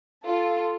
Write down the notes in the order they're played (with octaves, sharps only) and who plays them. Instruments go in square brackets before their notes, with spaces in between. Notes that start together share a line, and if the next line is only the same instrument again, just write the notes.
[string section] F4 A4